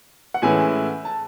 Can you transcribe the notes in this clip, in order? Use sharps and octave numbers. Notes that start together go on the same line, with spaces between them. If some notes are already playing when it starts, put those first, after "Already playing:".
F#5
A2 E3 G#3 C#4 E4 G#5
A5